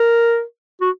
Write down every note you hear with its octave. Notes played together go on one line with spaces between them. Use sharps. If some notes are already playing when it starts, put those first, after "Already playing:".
Already playing: A#4
F#4